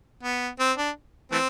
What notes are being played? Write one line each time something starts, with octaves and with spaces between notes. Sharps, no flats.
B3
C4
D4
E3 A3 C4